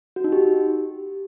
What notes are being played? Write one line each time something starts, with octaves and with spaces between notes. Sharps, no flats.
F#4
D#4
G4